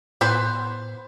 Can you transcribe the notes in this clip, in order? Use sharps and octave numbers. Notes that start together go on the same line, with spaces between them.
A2 B3 B4 C5